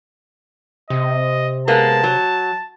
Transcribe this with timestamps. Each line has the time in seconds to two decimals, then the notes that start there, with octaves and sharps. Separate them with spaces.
0.90 C3 D#5
1.68 G#3 A#3 B3 A5
2.03 F#3